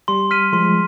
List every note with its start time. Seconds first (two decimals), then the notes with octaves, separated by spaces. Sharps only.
0.08 G3 C6
0.31 F6 B6 D#7
0.53 F3 G#3 C6